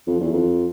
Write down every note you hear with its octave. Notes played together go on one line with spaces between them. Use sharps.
F2
E2
F2